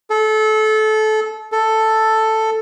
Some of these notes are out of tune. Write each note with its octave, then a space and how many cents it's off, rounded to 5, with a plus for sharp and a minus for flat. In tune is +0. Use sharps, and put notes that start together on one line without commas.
A4 -25
A4 +5